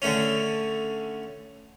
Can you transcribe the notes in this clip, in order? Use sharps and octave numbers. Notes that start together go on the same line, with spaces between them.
D3 A3 C#4